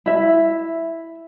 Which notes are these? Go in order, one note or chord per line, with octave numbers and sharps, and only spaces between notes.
E4 E5